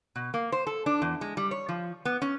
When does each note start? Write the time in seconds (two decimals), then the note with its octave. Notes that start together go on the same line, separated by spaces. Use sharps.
0.16 B2
0.34 A#3
0.52 C5
0.67 A4
0.86 D4
1.02 E2
1.21 G#3
1.37 G3
1.51 C#5
1.69 F3
2.05 B3
2.22 C#4